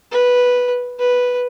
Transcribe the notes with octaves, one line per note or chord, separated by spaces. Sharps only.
B4
B4